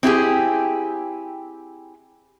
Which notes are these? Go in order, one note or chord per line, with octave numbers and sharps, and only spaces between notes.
C4 E4 G4 G#4